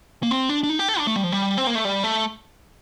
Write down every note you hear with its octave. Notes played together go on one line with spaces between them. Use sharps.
A#3
C4
D4
D4
D#4
G4
A4
D4
A3
G3
F3
G3
C4
A#3
A3
G3
A3